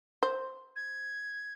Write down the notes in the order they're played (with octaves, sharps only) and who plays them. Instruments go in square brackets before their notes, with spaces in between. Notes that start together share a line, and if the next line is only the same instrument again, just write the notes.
[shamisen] C5
[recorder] G#6